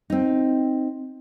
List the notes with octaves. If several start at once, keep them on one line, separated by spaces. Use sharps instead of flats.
C4 D#4